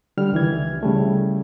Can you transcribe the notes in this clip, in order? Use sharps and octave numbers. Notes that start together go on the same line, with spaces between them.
D3 G3 F6
C#2 D#3 E3 G#6
C#3 G3 A3